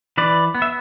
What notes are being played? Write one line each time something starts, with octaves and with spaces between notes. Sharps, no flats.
E3 B4 D5
B3
E5